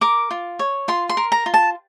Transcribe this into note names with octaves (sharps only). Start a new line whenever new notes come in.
A#4 D6
F4
C#5
F4 C6
C6
A#4
A#5
F4
A5